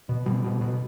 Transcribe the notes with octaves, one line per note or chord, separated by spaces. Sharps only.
B2
B2 G3
B2
B2